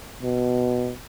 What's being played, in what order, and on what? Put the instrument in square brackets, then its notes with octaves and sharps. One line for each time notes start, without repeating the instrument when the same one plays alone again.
[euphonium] B2